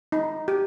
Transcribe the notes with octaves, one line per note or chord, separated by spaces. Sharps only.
D#4
G4